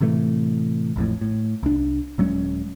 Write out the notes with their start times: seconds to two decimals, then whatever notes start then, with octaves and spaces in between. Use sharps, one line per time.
0.01 A2 C3 E3 A3
0.96 A1 F2 A2
1.21 A2
1.63 C2 D4
2.18 D#1 F#3 G#3 C#4